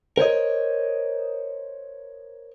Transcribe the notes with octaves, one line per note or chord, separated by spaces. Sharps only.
A#4 C5 C#5 D#5